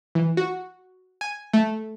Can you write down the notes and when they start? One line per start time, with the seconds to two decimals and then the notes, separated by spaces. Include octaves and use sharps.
0.15 E3
0.37 F#4
1.21 G#5
1.53 A3